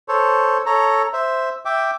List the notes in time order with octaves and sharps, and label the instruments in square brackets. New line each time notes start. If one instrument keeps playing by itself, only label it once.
[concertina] A4 C5 C#5
A4 C#5 A#5
C5 E5
E5 G5 D6